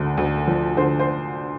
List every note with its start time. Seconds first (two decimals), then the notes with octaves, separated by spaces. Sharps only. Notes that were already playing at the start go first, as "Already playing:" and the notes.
Already playing: D2 D3
0.17 D2
0.47 F3
0.77 D3 C5
1.00 C5